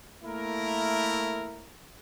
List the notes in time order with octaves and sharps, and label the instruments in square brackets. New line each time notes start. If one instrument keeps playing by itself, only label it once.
[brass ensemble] A3 A#3 E4 A#4